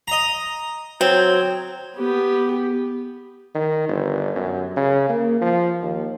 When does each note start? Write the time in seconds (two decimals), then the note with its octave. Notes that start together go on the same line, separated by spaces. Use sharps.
0.08 D#5 A#5
1.01 F#3 C4 C#5
1.98 B3 G4
3.55 D#3
3.88 G1
4.35 F#2
4.77 C#3
5.09 A#3
5.41 F3
5.82 D#2